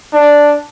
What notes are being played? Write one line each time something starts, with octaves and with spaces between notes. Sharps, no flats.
D4